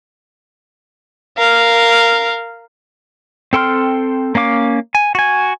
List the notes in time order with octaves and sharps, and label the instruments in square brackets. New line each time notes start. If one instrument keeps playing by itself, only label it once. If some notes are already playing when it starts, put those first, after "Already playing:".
[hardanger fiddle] A#4 F5
[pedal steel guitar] C4 A4 G5 C6 F6
A#3 C#4 F5 D6
G#5
F#4 G#5